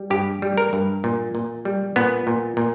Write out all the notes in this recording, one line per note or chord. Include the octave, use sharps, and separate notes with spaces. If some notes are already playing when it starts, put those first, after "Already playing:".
Already playing: G3
G2 G4
G3
A#4
G2
A#2
A#2
G3
A#2 B3
A#2
A#2